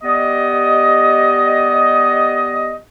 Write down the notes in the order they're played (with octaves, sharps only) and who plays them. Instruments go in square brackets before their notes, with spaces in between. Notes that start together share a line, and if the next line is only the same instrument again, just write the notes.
[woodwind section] G3 B3 G4 D#5